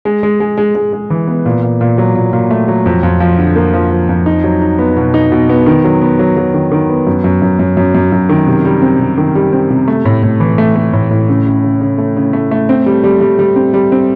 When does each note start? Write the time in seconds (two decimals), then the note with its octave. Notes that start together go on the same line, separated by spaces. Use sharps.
0.05 G#3
0.23 G#3
0.40 G#3
0.58 G#3
0.75 G#3
0.93 G#3
1.10 E3
1.27 B3
1.45 A#2
1.63 A#2
1.81 A#2
1.98 F#3
2.15 A#2
2.33 A#2
2.51 A3
2.68 F#3
2.86 F2
3.03 F2
3.20 F3
3.38 D3
3.56 A#3
3.74 F3
3.91 F3
4.09 F2
4.26 D#4
4.44 F#3
4.61 D#4
4.79 B3
4.96 B2
5.14 D#4
5.32 B2
5.49 B3
5.66 D#3
5.84 F#3
6.02 B3
6.19 F#3
6.37 F#3
6.54 D#3
6.72 D#3
6.89 B3
7.07 F#2
7.24 F#2
7.42 F#2
7.59 F#2
7.77 F#2
7.95 F#2
8.12 F#2
8.29 D#3
8.47 C3
8.65 G3
8.82 C4
9.00 C3
9.18 D#3
9.35 G3
9.53 C4
9.70 C3
9.88 A3
10.05 A2
10.23 A2
10.40 E3
10.58 A3
10.76 A3
10.93 A2
11.10 A2
11.28 C#3
11.46 C#3
11.64 C#3
11.81 C#3
11.98 A3
12.16 C#3
12.33 A3
12.51 A3
12.69 C4
12.86 G3
13.04 G3
13.21 G3
13.39 G3
13.56 C4
13.74 G3
13.92 C4